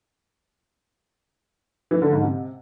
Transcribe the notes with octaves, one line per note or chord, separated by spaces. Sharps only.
E3
D3
G#2
C3